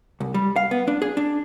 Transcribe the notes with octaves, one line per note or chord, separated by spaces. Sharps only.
C2
G3
F5
B3
D4
G#4
D4